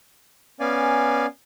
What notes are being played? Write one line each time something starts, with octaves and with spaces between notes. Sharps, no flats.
B3 C#4 D5 F5 G#5